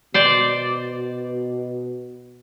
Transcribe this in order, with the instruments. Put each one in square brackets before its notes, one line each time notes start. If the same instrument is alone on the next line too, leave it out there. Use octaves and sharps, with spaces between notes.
[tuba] B2 [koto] C5 D5